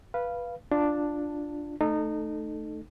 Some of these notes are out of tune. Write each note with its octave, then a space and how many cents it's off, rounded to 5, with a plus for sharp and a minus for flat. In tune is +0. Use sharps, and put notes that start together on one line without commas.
B4 -10 F5 -10
D4 +0 F4 +0 A5 +10
A3 +0 D#4 -25 A4 +0